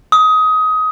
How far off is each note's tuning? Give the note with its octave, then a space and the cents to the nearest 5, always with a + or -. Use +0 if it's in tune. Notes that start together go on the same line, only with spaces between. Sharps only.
D#6 +20